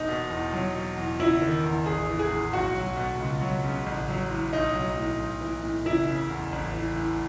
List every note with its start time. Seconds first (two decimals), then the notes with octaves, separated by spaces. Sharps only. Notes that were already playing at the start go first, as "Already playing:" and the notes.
Already playing: E1 D#4
0.08 B2
0.30 E2
0.53 F#3
0.75 B2
0.98 E2
1.20 F#1 E4
1.42 D#3
1.64 E2
1.86 A1 G#4
2.09 E3
2.19 G#4
2.30 A2
2.53 B1 F#4
2.75 F#3
2.97 B2
3.19 C#2
3.41 F#3
3.64 C#3
3.86 A1
4.09 F#3
4.31 A2
4.53 B1 D#4
4.75 F#3
4.97 A2
5.19 B1
5.41 E3
5.63 A2
5.85 F#1 E4
6.08 C#3
6.29 E2
6.52 A1
6.74 E3
6.96 A2